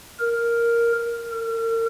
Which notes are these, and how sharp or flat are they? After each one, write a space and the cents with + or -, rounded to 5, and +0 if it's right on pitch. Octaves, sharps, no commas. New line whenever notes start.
A#4 +0
A#4 -40